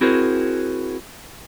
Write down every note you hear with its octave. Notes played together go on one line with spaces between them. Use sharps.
C4 E4 F#4 G#4 A#4 C5